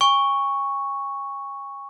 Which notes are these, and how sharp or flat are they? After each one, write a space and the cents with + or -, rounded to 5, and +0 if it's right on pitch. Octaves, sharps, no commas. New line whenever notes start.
G#5 -40 C#6 +0